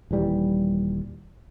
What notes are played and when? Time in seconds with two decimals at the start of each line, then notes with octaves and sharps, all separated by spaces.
0.11 D#1 E3 G3